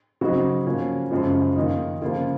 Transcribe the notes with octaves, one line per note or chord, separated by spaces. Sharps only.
C#3 F#3 C4 D#4 F#4
C#3 F3 A#3 C#4
F#2 C#3 F3 G#3
D#3 A#3 D#4 F4
C#3 F3 A#3 F4